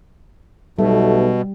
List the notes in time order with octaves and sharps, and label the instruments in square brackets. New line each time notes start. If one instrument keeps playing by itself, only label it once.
[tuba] B1 [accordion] B2 [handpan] G3 [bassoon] A3